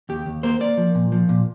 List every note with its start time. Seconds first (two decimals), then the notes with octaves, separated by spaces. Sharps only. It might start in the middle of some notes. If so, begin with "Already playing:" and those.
0.09 D#2 G4
0.26 D#2
0.43 A#3 C5
0.60 A#3 D5
0.77 F3
0.95 A#2
1.12 F3
1.29 A#2